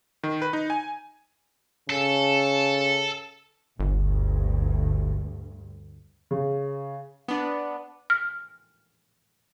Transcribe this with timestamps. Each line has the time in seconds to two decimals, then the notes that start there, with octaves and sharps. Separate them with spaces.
0.23 D#3
0.42 B4
0.53 D#4
0.70 G#5
1.90 C#3 A4
3.80 G1 D2 G2
6.31 C#3
7.28 B3 D4
8.10 F6